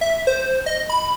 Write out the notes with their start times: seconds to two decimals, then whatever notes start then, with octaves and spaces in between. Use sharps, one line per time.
0.01 E5
0.27 C5
0.66 D#5
0.90 B5